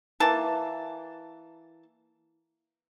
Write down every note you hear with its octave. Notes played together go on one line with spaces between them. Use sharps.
E3 A#3 A5